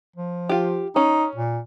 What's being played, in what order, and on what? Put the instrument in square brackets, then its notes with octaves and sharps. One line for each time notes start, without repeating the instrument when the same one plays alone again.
[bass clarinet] F3
[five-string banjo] F4 G4
[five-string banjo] C#4 [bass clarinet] D#4
[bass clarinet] A#2